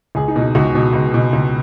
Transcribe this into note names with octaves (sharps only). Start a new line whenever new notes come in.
C#2 G#4
D#4
B2
D#4
C#2 F#4
B2
C#2
B2
C#2